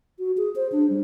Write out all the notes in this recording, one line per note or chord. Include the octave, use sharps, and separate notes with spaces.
F#4
G#4
C5
D4
G3